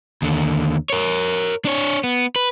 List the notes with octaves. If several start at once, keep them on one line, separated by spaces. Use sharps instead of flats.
D#2 D3
A#4 C#5
D4 C#5
B3
B4